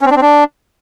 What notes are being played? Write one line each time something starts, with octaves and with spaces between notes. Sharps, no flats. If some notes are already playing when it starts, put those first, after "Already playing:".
C#4
C4
D4
C4
D4